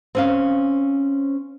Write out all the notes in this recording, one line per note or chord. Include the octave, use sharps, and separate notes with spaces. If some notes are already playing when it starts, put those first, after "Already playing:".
C4 C#4 F5